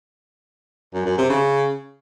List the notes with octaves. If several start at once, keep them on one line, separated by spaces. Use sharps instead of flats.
F#2
F#2
C3
C#3